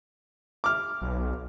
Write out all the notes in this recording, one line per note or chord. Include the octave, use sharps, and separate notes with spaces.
D6 F6
B1